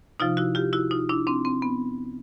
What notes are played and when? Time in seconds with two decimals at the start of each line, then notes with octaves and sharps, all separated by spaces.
0.20 C3 F3 D#4 F4
0.37 E4 F#4
0.55 F4 G4
0.73 E4 F#4
0.91 D#4 F4
1.09 D4 E4
1.27 C4 D4
1.45 C4
1.62 B3